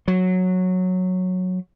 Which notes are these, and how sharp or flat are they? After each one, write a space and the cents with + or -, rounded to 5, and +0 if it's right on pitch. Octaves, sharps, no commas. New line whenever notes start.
F#3 -10